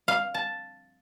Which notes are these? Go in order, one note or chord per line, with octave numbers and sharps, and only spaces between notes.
F5
A5